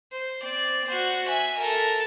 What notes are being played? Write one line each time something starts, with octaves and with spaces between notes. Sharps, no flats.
C5
C4 D5
F#4 C5
E5 G#5
A4 A#4